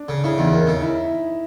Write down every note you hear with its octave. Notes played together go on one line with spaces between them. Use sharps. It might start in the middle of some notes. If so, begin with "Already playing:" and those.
Already playing: D4
C#3
C#3 E4
E2 D#4
D#2
C#3
E4